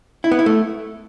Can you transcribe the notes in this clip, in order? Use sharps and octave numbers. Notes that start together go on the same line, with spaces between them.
E4
B3
E4
A3